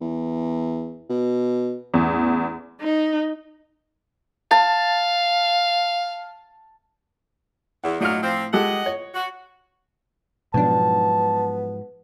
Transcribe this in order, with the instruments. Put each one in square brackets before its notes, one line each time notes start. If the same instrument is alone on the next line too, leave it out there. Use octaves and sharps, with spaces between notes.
[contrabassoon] E2
B2
[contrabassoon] A1 [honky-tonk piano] E2
[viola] D#4
[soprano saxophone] F5 [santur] A5
[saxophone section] E2 [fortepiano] F#5
[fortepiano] A2 F4 F6 [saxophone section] F#3 D4 D#4
[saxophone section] F3 C4
[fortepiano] G#3 G4 A4 [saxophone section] D#5 F#5
[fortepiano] C#5
[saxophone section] F#4
[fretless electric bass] G#2 F3 F#3 [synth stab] B2 D4 [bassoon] B3 [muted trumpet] A5